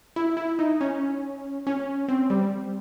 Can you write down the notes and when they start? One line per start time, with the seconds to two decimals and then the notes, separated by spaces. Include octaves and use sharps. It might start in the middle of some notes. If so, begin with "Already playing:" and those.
0.16 E4
0.37 E4
0.59 D#4
0.81 C#4
1.67 C#4
2.09 C4
2.30 G3